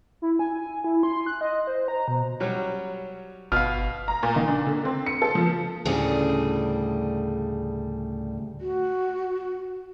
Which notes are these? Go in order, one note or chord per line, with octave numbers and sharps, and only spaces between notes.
E4
G#5
E4
C6
F#6
D#5
C5
A#5
B2
F#3 G3 C#4
G1 B2 F5 F6
A#5
A#2
D#3
D4
D3
C4
C#7
A4
F3
D2 A2 C#3 G3 G#4
F#4